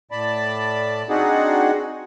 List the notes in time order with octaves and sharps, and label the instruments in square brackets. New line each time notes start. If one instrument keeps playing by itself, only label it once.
[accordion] A2 D5 A5 B5
C4 D4 D#4 F#4 G#4 F#5